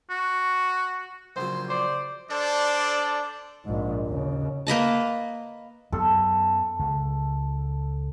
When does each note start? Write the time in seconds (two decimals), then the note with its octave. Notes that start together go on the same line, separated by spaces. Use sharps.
0.10 F#4
1.36 A#1 C#3 F#3 C5
1.70 C5 D5
2.30 D4 A4 C5 D5
3.65 A#1 G#2
4.06 D#2 C#3
4.67 A#3 B4 D#5 A5
5.92 F#2 F#3 B3 A4
6.79 C#2